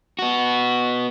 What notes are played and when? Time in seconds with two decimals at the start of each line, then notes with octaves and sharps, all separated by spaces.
0.19 B3 F#4